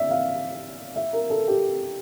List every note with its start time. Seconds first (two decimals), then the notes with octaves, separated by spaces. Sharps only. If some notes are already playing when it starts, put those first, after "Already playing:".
Already playing: D5 E5
0.11 F5
0.96 E5
1.13 A#4
1.30 A4
1.48 G4